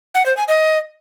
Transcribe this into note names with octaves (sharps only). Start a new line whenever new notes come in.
F#5
C5
G#5
D#5